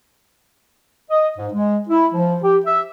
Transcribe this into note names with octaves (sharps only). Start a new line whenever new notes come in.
D#5
G#2
G#3
E4
F3
G4
E5